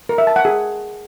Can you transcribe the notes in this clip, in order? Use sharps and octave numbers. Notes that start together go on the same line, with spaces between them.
A#4
E5
A5
F#5
G#4